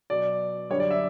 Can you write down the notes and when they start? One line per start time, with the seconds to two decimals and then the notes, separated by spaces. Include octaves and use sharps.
0.10 B2 F#3 D5
0.70 F#2 D3 G3 C#5
0.80 D5
0.91 E5